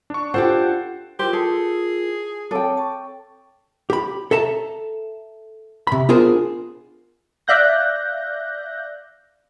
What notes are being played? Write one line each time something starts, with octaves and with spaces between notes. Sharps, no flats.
D4 C#6
D4 F4 G4 A4 C5 F#5
E4 F4 G4 A#4 C5
G#4 A4
C4 A4 C#5 G5 D6
A5 C#6
G4 B5
A4 E5 A5 A#5
C3 B5
B3 D4 F4 G#4 A#4 C5
D5 E5 F5 F#6 G6 A#6